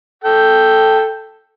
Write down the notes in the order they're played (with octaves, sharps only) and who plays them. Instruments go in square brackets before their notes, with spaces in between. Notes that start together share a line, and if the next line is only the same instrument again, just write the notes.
[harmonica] A4 G5